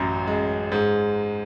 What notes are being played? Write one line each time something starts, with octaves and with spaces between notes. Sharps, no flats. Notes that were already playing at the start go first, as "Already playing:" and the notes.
Already playing: A1 F#2
G#3
G#2